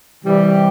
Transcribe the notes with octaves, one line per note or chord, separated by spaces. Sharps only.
C3 E3 G3